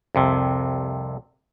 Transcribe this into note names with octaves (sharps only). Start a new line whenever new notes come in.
C2 F2 C3